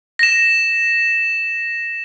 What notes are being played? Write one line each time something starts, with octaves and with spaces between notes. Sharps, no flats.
A#6 E7